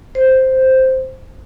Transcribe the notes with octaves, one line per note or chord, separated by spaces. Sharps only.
C5